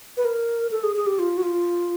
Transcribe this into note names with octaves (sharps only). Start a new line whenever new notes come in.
B4
A#4
A4
G#4
G#4
G4
F4
F#4
F4